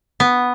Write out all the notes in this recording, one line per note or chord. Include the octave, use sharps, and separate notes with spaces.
B3